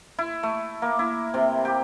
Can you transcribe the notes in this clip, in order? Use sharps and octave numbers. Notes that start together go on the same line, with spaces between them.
E4
A3
A#3
E4
C3
G4